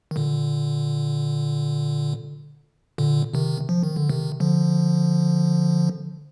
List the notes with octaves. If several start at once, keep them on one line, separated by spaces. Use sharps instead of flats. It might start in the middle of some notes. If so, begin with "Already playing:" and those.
D#3
A#2 D3
A#2 D3
C3 D#3
F3
D#3
D3
C3 D#3
D3 F3